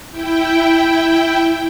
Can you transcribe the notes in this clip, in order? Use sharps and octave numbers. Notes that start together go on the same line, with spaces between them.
E4 G5